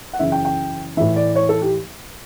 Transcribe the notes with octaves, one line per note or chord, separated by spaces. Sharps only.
F#5
F#2 C#3 E3 E5
G5
G5
A2 E3 E5
D5
C#5
A4
G4